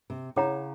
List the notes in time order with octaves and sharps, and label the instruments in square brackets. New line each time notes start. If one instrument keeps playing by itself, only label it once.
[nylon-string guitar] C3
[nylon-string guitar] C#3 [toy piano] E4 G#4 C#5 F#5 A#5